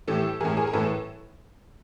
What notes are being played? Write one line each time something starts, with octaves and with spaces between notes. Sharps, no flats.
A2 E3 G4 A4
A2 E3 G#4 A#4
G#4 A#4
A#4
A2 E3 A4 B4